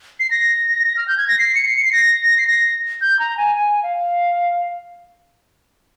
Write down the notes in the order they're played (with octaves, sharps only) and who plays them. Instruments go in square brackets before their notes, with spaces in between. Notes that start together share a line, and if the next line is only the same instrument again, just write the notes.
[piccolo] C7
A#6
F6
G6
G#6
A#6
C7
C#7
C7
C#7
C7
A#6
C7
A#6
G6
A#5
G#5
G#5
F5